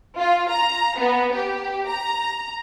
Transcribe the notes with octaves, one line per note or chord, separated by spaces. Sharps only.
F4
A#5
B3
G4
A#5